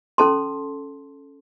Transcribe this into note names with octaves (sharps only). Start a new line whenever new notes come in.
C#4 A4 A5 C6